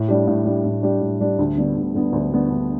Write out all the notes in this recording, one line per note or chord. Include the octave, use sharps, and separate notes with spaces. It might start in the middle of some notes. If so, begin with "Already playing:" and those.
Already playing: A2
G3 D4 G4
A2
G3 D4 G4
A2
G3 D4 G4
A2
G3 D4 G4
D2
D3 G3 B3 D4
D2
D3 G3 B3 D4
D2
D3 G3 B3 D4
D2